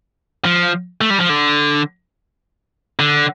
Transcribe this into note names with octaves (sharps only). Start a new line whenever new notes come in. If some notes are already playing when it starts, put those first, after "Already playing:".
F3
A3
G3
F3
D3
D3